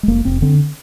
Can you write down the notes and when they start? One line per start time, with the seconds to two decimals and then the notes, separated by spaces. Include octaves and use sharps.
0.03 G#3
0.08 F1 A#3
0.25 F1 C4
0.42 D3 C4